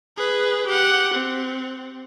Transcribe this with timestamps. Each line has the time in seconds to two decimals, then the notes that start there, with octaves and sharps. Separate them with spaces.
0.17 G#4 B4
0.67 G4 F#5
1.14 C4